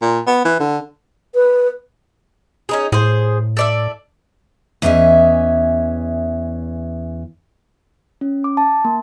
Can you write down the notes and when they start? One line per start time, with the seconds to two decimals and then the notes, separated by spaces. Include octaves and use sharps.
0.02 A#2
0.27 B3
0.45 E3
0.60 D3
1.34 B4
2.69 C#4 D#4 G#4
2.92 A2 G#4 C5
3.57 A4 D5 E5
4.82 E2 E3 C#4 D#5 E5
8.21 C#4
8.44 D6
8.57 A5
8.85 A#3